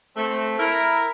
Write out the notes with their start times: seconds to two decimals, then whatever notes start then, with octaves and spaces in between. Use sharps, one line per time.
0.17 A3 C4
0.59 E4 A#4